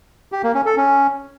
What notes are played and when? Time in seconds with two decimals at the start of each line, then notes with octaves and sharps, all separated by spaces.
0.32 G4
0.43 A#3
0.55 C#4
0.66 A4
0.77 C#4